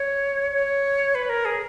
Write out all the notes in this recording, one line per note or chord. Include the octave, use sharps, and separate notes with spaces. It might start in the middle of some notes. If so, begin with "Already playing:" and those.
Already playing: C#5
C#5
B4
A#4
G#4